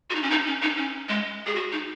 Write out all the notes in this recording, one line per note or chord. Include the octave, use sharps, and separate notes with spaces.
F#4
D#4
C#4
D#4
C#4
D#4
C#4
G#3
G#4
F#4
D#4